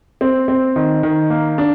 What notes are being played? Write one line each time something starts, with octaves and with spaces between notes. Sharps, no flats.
C4
C4
D#3
D#3
A#3
D4